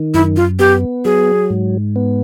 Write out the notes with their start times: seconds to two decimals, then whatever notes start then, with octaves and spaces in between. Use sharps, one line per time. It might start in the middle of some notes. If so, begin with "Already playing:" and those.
Already playing: D#3
0.14 F#2 E4
0.36 F4
0.59 B3 G4
1.05 F#3 G#4
1.50 G#2
1.96 B3